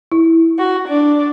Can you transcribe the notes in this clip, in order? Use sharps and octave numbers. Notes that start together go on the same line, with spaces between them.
E4
F#4
D4